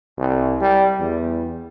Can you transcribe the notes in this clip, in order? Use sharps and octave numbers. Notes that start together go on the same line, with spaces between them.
C2
G3
E2